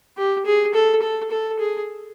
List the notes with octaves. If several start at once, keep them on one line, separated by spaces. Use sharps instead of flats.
G4
G#4
A4
A4
A4
G#4